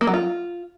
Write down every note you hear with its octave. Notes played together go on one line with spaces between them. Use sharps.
A#3
F#3
F4